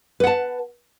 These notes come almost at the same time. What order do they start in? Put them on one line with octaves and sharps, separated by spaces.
B4 F#5 A5